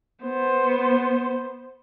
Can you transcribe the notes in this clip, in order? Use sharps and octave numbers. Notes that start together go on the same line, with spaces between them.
B3 C5